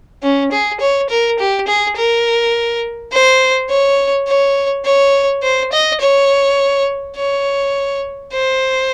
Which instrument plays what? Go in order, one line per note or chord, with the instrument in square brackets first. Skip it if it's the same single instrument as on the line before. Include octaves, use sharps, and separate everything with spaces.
[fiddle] C#4
G#4
C#5
A#4
G4
G#4
A#4
C5
C#5
C#5
C#5
C5
D#5
C#5
C#5
C5